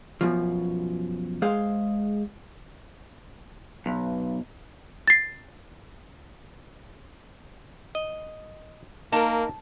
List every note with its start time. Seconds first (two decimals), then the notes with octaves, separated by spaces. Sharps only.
0.21 F#2 B2 F3
1.42 G#3 G#4 C5 F5
3.86 B1
5.08 A6 C7
7.95 D#5
9.13 A#3 D#4 A#4 A5